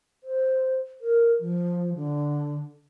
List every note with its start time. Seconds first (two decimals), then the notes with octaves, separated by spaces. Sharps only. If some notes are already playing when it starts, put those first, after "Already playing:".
0.24 C5
1.01 A#4
1.41 F3
1.96 D3